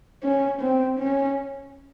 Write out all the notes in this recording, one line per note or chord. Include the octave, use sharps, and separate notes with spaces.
C#4
C4
C#4